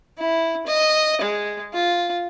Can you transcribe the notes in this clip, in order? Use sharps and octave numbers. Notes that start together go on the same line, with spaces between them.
E4
D#5
G#3
F4